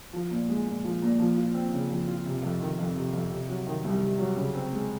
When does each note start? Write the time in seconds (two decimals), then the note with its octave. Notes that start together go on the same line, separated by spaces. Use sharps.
0.13 F3
0.31 A#2
0.48 G#3
0.66 A#2
0.84 F3
1.02 A#2
1.19 F3
1.37 F4
1.54 C4
1.72 C#3
1.90 F3
2.07 F4
2.25 C3
2.42 F2
2.60 D#3
2.78 F2
2.95 C3
3.13 F2
3.31 C3
3.49 F#3
3.66 D#3
3.84 C2
4.02 C3
4.19 F#3
4.36 C#3
4.55 C4
4.72 G#3